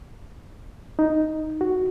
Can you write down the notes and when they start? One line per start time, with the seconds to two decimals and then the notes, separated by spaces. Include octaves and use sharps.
0.99 D#4
1.61 F#4